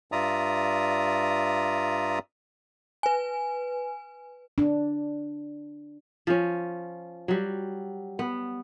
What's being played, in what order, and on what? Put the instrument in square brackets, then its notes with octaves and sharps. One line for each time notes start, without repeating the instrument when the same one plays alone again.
[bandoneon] G2 F4 D5 E5 A#5 D#6
[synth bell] B4 G#5
[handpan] D4
[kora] F3 C#4
F#3 G3
B3